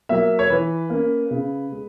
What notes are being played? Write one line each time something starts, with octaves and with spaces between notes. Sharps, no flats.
F#3 A#3 E5
C#5
E3 B4
A#3 C#4
C#3
G#3